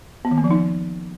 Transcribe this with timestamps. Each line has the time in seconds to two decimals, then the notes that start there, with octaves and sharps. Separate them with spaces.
0.25 B3
0.31 D#3
0.38 A#3
0.44 F3
0.51 D#4